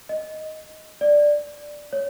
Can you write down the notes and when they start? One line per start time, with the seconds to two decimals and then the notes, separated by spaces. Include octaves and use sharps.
0.09 D#5
1.01 D5
1.93 C#5